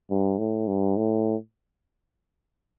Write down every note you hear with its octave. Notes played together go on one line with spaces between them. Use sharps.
G2
A2
G2
A2